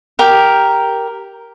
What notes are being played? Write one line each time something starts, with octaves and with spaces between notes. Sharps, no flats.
G4 A#4